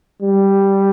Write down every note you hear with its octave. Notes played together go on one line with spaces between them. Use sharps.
G3